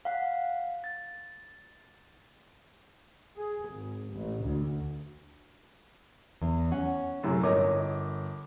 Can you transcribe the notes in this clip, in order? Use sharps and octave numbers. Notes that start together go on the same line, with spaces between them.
F5 F#5
A6
G#4
G#1
A1
D2
E2
C#4 F#5
F#2 A2 C3
G1 A#4 C#5 D#5 D6